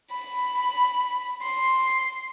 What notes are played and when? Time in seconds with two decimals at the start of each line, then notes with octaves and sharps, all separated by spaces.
0.11 B5
1.42 C6